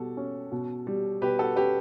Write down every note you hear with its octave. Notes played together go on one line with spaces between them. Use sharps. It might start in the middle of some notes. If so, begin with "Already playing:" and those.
Already playing: B2 G3 F#4 G4 A4
C#4
B2
G3
B2 G4 B4
F#4 A4
C#4 G4 B4